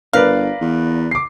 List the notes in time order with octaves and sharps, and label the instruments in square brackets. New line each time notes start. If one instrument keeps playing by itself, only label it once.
[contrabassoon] G1 [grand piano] A#4 B4 D5 [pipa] F5
[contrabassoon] E2
[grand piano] D6 C7